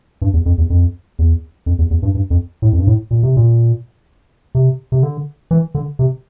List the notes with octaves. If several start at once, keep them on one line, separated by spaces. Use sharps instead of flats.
G2
E2
F2
E2
F2
E2
F2
E2
E2
G2
G2
F2
A2
F2
G2
A2
A#2
C3
A#2
C3
C3
D3
E3
D3
C3